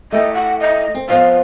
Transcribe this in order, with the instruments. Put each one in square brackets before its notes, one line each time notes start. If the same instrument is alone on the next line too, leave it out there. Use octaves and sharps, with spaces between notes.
[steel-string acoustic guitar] A3 E4 G4 [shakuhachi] D#5
[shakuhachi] F#5
D#5
[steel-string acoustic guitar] C4
[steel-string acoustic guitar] F2 F3 B3 [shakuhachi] F5